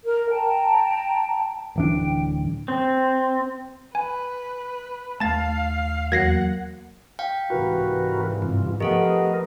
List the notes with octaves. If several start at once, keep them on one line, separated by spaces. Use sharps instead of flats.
A#4
G5 A5 A#5
D1 E3 D4 G5
C4
B4 G#5
D#2 A3 F5 A5 A6
E2 F#3 A#3 F#5 G#6 A#6 C7
F5 G5
C2 G#2 E3 F#4 A#4 B4
G2 C3 F4
F3 A3 B3 G4 A4 A#4 D#5 F#5